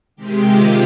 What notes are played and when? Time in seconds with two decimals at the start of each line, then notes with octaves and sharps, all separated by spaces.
0.16 C3 D#3 G#3 C4 G4
0.46 F4